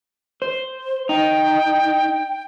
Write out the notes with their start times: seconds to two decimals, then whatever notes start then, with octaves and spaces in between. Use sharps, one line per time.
0.42 C5
1.09 D#4 G5